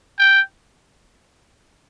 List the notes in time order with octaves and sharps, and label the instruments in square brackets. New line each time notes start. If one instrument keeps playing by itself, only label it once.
[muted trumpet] G5